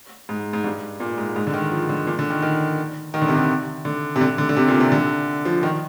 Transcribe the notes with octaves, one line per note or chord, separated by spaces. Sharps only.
G#2
G#2
G2
A#2
G#2
G#2
D3
D#3
F3
D3
A#2
D3
D#3
D#3
D#3
D3
C3
D3
D3
C3
D3
D3
D3
C3
A#2
C3
D3
F3
D#3